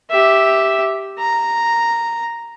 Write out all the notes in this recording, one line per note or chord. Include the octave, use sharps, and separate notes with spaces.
G4 E5
A#5